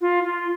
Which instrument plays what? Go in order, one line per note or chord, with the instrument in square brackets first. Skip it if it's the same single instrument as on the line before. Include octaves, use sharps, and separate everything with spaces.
[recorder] F4
F4